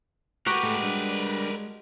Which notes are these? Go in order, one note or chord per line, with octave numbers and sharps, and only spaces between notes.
G#3 F#4 G4 A#4 B4 F#5 G5
A2 G#3 A3
G3 D4